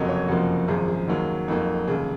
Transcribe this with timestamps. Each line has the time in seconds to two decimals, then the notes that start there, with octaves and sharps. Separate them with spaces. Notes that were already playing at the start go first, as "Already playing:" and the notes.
Already playing: F#1 F2 C3 F#3 A#3 D#5
0.09 C#5
0.28 F#1 F2 C3 F3 A#3 F#4
0.68 G#1 F#2 F3 G#4
0.88 G#4
1.08 D#2 D#3 F#3 A#3
1.48 F2 D#3 F#3 A#3
1.87 F1 D#2 C#3 G#4